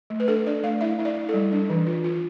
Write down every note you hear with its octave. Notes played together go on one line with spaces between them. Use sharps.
A3
B4
D4 A4
D4 D5
A3 F5
E4 E5
E4
D5
E4
A4
G3
D4
E3
F4
F4